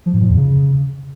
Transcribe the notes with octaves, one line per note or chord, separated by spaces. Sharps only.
F3
G#2
A#2
E2
C#3